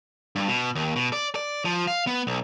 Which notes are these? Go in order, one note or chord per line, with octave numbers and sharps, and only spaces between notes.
G2
B2
D#2
B2
D5
D5
F3
F5
B3
B1